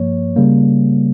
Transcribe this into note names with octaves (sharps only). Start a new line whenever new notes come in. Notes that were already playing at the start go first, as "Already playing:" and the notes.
Already playing: G2 F3 A#3 C#5
C#3 G3 A#3